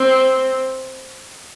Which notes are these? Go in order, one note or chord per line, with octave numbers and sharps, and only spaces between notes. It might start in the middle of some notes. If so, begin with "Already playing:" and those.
Already playing: C4